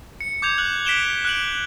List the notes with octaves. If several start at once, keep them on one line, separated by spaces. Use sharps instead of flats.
C#7
D6 G6 G#6 F7
F#6 F#7
B6 D7 E7 G7
F#6 D7 F#7